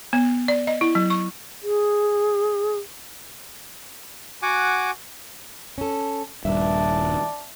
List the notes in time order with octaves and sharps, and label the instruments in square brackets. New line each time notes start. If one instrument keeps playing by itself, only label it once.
[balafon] B3
D5
D#5
E4
F#3
C#6
[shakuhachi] G#4
[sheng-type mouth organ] F#4 F#5 G#5 D6
[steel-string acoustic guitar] C#4 A4
[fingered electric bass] D#1 G2 [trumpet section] D4 D5 A5 [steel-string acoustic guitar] E5